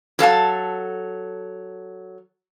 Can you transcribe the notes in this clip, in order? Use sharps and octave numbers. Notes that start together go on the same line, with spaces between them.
F#3 A4 F5 A5